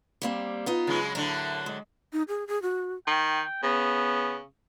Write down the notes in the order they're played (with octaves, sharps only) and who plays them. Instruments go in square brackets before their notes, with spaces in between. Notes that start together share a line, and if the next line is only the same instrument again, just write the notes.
[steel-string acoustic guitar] G3 A#3 C4
B3 D#4 F4
[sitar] C#3 F#3 G#3
[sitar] A2 D3 F#3 [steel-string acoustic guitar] A#4 A5
[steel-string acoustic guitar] G#3
[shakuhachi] D#4
G#4
G#4
F#4
[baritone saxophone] D#3 [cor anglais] G5
[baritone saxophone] C#3 [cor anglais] B3